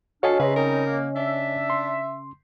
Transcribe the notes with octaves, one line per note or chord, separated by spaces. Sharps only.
D4 F#4 A4 C#5 D#5 F5 G#5
C#3 B4 E5 A#5 C6
G3 C4 D#4 A#4
A#3
D4 E5
C6